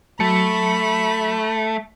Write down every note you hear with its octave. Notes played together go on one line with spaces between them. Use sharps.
F#3 A3 A5 B5 C#7